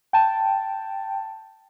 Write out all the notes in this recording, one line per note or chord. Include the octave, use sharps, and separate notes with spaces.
G5 A5